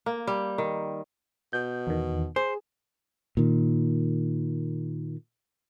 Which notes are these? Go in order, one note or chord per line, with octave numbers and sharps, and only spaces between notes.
A#3
G3
D#3
B2 G6
E2 D#3
G#4 C5
A#2 D#3